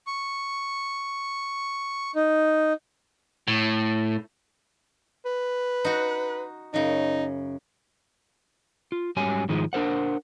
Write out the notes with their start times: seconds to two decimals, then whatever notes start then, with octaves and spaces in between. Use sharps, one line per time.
0.07 C#6
2.15 D#4
3.48 A2
5.26 B4
5.85 D#4 F#4
6.74 F#2 C#3 D#4
8.92 F4
9.17 G#2 F#3 G3 C#4 G#5
9.49 G#2 D#3 F3 G#3
9.73 D4 A#4 C5 F#5